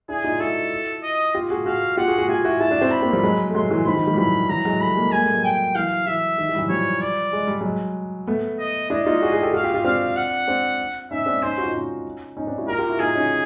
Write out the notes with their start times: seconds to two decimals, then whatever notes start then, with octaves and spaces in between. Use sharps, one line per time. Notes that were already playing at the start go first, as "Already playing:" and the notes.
0.09 D4 E4 G#4
0.24 D#4 F4
0.40 E4 F#4 A4
1.03 D#5
1.34 F4 G4
1.50 F#4 G#4
1.66 F#4 G#4 F5
1.97 F4 G4 F#5
2.08 F#4 G#4
2.18 F#4 G#4
2.29 F4 G4 G#5
2.44 E4 F#4
2.60 E4 F#4 A5
2.71 D4 E4
2.81 C4 D4
2.92 B5
3.02 A#3 C4
3.13 F3 G3
3.23 F#3 G#3
3.50 A3
3.55 F#3 G#3 C6
3.70 E3 F#3
3.86 D#3 F3 B5
3.97 D#3
4.07 D#3 F3
4.13 G3
4.18 E3 F#3 B5
4.49 E3 F#3 A#5
4.65 F#3 G#3
4.81 G3 A3 B5
4.96 G#3 A#3
5.12 G#3 A#3 G#5
5.22 G3 A3
5.33 F#3 G#3
5.44 G5
5.75 E3 F#3 F5
6.07 E3 E5
6.38 D#3
6.49 E3
6.54 G3
6.59 E3 F#3
6.69 F3 G3 C#5
7.01 D5
7.33 G#3
7.47 G3
7.61 F#3 G#3
8.27 A3 B3
8.59 D#5
8.90 D4 E4 D#5
9.06 D#4 F4
9.22 F#4 G#4
9.32 F#4 G#4
9.43 G4 A4
9.53 F#4 G#4 F5
9.64 F4 G4
9.74 F4 G4
9.84 C4 D4 F5
10.16 F#5
10.48 C4 D4
11.11 C#4 D#4 E5
11.26 C4 D4
11.42 C#4 D#4 C5
11.58 F#4
11.63 D#4 F4
11.73 C#4 D#4
12.37 C#4 D#4
12.47 C4 D4
12.58 E4 F#4
12.68 F4 G4 A#4
12.79 F4 G4
12.89 E4 F#4
12.99 D#4 F4 G#4
13.15 C#4 D#4